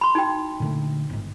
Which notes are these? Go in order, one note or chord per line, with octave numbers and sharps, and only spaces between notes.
B5 C6
D#4 F#4 G5
A#2 D3 A3
G1 G#2